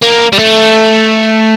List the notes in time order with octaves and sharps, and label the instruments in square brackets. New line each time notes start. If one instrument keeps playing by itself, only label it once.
[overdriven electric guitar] A#3
G3
A3